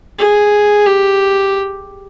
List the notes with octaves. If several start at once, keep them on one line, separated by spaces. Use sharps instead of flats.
G#4
G4